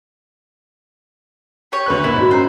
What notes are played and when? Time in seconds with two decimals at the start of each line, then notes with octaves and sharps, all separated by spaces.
1.72 G4 C#5
1.86 D2 B4 F#6
2.04 A#2 E4
2.16 G#2 F#4 C#5
2.31 C#4 F4 C5 A#5